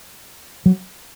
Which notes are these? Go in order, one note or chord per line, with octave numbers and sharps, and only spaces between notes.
F#3